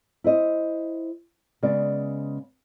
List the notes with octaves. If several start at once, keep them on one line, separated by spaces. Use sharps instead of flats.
E4 C5 D#5
C#3 G#3 B3 D5